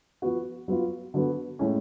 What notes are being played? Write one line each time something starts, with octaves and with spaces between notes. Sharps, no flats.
F3 B3 F#4
F#3 B3 F4
D3 F#3 B3
A2 G#3 C#4